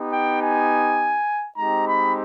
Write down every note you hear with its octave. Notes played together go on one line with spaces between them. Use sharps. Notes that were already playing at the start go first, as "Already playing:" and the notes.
Already playing: B3 D#4 G4
G5
G#5
G#3 C4 D#4 G4 A#5
B5